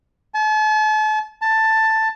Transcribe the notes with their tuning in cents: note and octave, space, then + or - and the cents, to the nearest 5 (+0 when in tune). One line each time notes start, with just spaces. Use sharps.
A5 -40
A5 +10